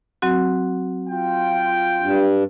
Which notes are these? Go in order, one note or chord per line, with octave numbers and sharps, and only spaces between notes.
F#3 C4 F#4
F4 G5
G2